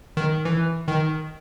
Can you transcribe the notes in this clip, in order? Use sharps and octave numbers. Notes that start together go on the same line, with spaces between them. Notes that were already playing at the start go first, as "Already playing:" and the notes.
D#3
E3
D#3